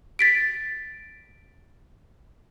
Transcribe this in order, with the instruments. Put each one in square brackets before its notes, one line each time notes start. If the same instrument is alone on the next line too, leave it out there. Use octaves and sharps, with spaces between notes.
[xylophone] A6 B6 D7